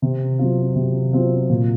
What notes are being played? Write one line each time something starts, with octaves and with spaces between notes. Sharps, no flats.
C3
F#3 C4 F4
C3
F#3 C4 F4
A#2